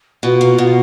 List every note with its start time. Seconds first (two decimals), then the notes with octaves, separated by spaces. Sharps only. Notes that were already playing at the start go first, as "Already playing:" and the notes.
0.23 B2 F4
0.41 A#3
0.58 B2